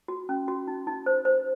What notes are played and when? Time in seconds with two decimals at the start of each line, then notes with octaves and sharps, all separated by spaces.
0.08 F#4
0.29 C#4
0.48 F#4
0.67 D#4
0.87 D#4
1.06 C5
1.25 C5